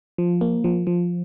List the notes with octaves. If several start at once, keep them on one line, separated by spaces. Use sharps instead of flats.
F3
A#3
F3
F3